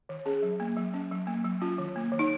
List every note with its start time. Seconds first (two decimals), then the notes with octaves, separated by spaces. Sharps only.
0.09 D#3
0.26 C#4 G#4
0.43 F#3
0.60 A#3
0.77 F#3
0.94 C#4
1.11 F#3
1.27 A#3
1.45 F#3
1.61 C#4 F4
1.78 D#3
1.96 A#3
2.12 D#3
2.19 D#4